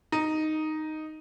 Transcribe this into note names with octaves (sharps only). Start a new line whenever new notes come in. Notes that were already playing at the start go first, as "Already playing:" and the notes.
D#4